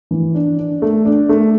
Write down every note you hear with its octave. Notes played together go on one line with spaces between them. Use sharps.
E3
D4
D4
A3
D4
A3